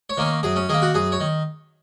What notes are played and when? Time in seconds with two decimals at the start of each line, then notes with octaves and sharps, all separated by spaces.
0.10 C#5
0.18 D#3 A#3 C#4
0.43 F#2 G#4
0.56 C#4
0.69 D#3 A#3 G#4
0.82 F#4
0.94 F#2 G#4
1.12 C#5
1.20 D#3